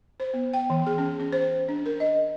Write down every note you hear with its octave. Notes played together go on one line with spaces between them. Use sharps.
C5
B3
G5
E3
G#4
C#4
C#4
C5
D4
A#4
D#5